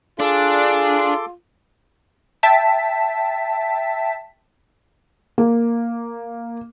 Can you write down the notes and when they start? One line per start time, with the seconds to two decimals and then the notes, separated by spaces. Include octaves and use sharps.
0.20 D4 F4 G#4 A4 C6 D6
2.43 E5 G5 A5 B6
5.38 A#3